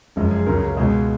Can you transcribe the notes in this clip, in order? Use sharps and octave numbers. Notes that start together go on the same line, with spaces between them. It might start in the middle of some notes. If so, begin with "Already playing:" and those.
F#1 F#2 F3 G#3
G#4
C#2 C#3 F#3 A#4
G#4
A#4
C#2 B2 G#3 G#4